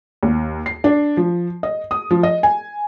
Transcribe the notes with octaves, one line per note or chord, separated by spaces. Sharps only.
D#2
C7
D4
F3
D#5
D#6
F3
D#5
G#5